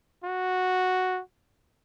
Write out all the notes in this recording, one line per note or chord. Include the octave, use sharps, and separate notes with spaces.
F#4